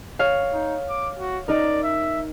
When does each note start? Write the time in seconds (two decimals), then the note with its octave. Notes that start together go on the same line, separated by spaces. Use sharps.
0.19 C#5 F5
0.53 D#4
0.88 D6
1.19 F#4
1.48 D#4 A#4 D5
1.83 E5